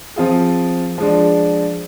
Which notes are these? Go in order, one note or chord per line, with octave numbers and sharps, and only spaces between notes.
F3 C4 F4 G#4
F3 G#3 D4